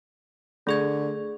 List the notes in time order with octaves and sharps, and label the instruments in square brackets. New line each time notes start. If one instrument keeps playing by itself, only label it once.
[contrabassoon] D3 [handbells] A3 G#4 G#6